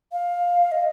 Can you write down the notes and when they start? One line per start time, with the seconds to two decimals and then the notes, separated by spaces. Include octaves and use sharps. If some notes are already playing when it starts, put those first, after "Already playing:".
0.12 F5
0.72 D#5